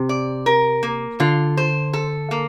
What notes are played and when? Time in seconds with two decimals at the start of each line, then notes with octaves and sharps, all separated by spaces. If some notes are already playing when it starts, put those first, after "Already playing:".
Already playing: C3
0.09 D5
0.46 A#4
0.83 A#3
1.20 D3 F4
1.57 C5
1.93 A4
2.31 A#3